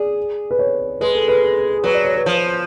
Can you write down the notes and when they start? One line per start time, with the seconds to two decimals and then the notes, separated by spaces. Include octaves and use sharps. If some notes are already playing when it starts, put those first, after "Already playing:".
Already playing: G#4 D5
0.51 B4
0.59 C#5
1.01 G#3 B4
1.15 A4
1.28 B4
1.84 F#3 B4
1.94 D5
2.05 C#5
2.16 B4
2.26 F3 B4